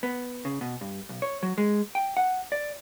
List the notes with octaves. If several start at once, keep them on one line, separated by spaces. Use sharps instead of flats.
B3
C#3
B2
G2
B1
C#5
F#3
G#3
G5
F#5
D5